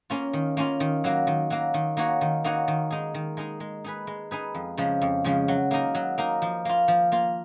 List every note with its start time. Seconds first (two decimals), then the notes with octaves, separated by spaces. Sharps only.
0.10 A#3 C#4 F4
0.33 D#3
0.57 A#3 C#4 F4
0.80 D#3
1.04 F#3 A#3
1.27 D#3
1.50 F#3 A#3
1.74 D#3
1.97 A#3 D#4 F#4 C#5
2.21 D#3
2.44 A#3 D#4 F#4 C#5
2.68 D#3
2.91 G#3 D#4 G#4
3.14 D#3
3.37 G#3 D#4 G#4
3.60 G#3
3.84 D#4 G#4 B4
4.07 G#3
4.31 D#4 G#4 B4
4.55 F2
4.78 C#3 F3 G#3
5.02 F2
5.24 C#3 F3 G#3
5.48 F#3
5.71 A#3 D#4 A#4
5.95 F#3
6.18 A#3 D#4 A#4
6.42 F3
6.65 A#3 F4
6.88 F3
7.12 A#3 F4